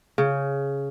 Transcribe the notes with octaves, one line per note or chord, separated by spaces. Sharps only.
C#3